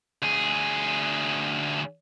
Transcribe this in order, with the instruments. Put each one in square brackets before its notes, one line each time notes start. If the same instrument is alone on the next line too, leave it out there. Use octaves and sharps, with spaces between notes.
[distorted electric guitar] D2 G#4